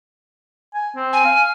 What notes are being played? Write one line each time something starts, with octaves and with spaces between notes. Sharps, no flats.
G#5
C4
G#5
F5